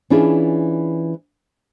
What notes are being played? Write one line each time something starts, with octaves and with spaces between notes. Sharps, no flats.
E3 C#4 D4 E4 F4 G#4